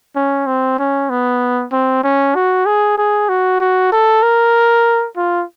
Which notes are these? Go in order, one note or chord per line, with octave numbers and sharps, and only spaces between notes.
C#4
C4
C#4
B3
C4
C#4
F#4
G#4
G#4
F#4
F#4
A4
A#4
F4